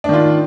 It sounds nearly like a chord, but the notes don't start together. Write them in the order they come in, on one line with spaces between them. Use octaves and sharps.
D4 D#3 F4